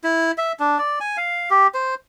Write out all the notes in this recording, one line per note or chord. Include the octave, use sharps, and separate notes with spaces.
E4
E5
D4
D5
G#5
F5
G4
C5